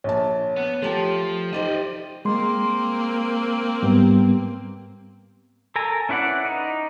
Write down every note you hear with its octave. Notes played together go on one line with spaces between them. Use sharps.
A#1 C#5 A5
B3
F3 A3 G4 A5
D#4 G4 C5 D5 D#5
G#3 A#3 C4 C6
G#2 G3 B3
A4 A#4 G#5 A#5
C#4 E4 B4 D5 F#5
D#4